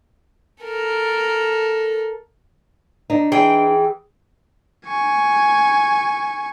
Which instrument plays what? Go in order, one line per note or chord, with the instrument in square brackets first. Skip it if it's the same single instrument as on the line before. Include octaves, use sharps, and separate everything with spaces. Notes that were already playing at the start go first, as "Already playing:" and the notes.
[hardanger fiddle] A4 A#4
[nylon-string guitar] D4 D#4
[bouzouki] E3 G#4 G5
[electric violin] G#5 C#6